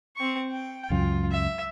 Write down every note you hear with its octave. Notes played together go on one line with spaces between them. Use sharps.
C4 C#6
G5
C#2 F#2 F4
E5